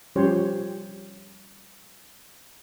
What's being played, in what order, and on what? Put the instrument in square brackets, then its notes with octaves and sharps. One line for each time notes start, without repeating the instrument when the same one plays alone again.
[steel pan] F3 G3 C#4 G4 C5 C#5